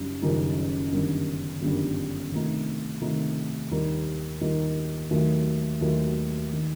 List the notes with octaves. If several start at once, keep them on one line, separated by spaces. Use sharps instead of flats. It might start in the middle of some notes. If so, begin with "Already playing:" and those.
Already playing: F#1 F#2 G3 D#4
F#1 F#2 D#3 G3 D#4
G1 F#2 D#3 G3
G1 F#2 D#3 G3
C3 D#3 A3 D#4
C3 D#3 A3 D#4
D#2 D#3 G3 D#4
D#2 D#3 G3 D#4
D#2 D#3 F#3 A3
D#2 D#3 F#3 A3
D#3